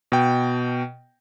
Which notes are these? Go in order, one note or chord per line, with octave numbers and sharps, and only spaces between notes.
B2 G5